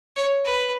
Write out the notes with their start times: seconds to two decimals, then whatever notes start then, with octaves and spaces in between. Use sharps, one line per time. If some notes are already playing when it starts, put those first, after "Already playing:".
0.16 C#5
0.45 B4